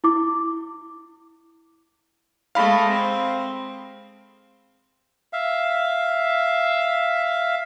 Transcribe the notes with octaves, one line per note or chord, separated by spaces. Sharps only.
E4 D6
G#3 A3 F5 B5
C4
E5 F5